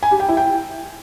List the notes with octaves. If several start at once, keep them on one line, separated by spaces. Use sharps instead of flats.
G#5
G4
G5
E4
G5